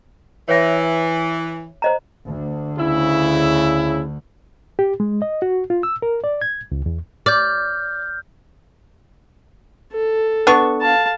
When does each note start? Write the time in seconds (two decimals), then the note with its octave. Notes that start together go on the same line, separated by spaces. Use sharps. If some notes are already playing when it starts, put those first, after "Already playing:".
0.49 E3 C#5 E5
1.82 C5 D#5 A#5
2.27 D2
2.78 C#3 E4
4.79 G4
5.00 G#3
5.22 D#5
5.42 F#4
5.70 F4
5.83 E6
6.02 A#4
6.24 D5
6.42 G#6
6.72 C#2
6.86 E2
7.26 D5 F6 G6
9.93 A4
10.47 B3 D4 C#6
10.81 F5 A5